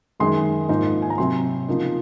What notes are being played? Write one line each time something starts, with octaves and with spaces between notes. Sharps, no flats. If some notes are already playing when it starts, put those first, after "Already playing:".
F#2 D#3 G#3 D#4 C6
G#2 F3 A#3 D#4
G#5
A#5
C3 F#3 C4 C6
C#3 F3 A#3 D#4